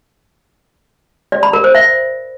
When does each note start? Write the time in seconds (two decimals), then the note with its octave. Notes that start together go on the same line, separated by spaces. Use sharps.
1.32 D5
1.43 B5
1.53 A#4
1.64 C5
1.75 E5